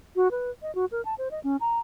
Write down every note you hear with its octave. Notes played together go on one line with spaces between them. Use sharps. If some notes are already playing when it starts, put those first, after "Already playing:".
F#4
B4
D#5
F#4
A#4
A5
C5
D#5
C#4
A#5